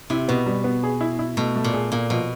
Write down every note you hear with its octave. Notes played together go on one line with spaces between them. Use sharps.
C3 E4
B2 B3
G3
B3
G#4
E4
E4
B2 A3
A3
A#2
G#4
A#2 A#3
B2 F3